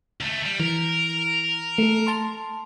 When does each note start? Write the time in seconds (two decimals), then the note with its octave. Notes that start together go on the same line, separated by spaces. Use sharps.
0.21 C#2 A3
0.46 G3
0.60 E3 A#4
1.78 A3 A4
2.07 A5 C6